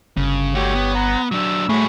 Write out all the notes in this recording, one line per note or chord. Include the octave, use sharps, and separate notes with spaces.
G1 C#3
A3 F#4 G4 C#5
B3
F#5 A#5
F#3 D4 E6
A2 F#3 A3 G#4 B5 C#6